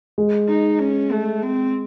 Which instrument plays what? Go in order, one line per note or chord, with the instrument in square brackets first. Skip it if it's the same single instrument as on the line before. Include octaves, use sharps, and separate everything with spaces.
[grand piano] G#3
[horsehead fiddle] D#4
C#4
A3
C4